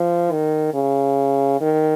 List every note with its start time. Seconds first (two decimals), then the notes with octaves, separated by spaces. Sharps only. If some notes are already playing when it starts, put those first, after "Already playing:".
Already playing: F3
0.32 D#3
0.74 C#3
1.61 D#3